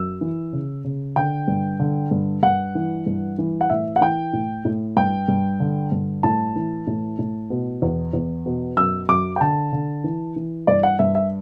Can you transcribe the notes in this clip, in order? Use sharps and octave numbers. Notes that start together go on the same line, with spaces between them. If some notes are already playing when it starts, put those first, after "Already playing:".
Already playing: F#2 E6
E3
C#3
C#3
D3 G5
G2
D3
G2
G2 F#5
E3
G2
E3
F#5
A2 E5
F#5
E3 G5
A2
A2
G2 G5
G2
D3
G2
A2 A5
E3
A2
A2
B2
E2
E2
B2
F#2 E6
F#2 D6
G5
D3 A5
D3
E3
E3
G2 D5
F#5
G2 E5
E5